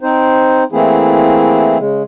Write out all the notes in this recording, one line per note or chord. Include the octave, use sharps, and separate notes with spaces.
C4 D#4 C5
E3 A3 A#3 C4 E4 G#4
C#3 G#3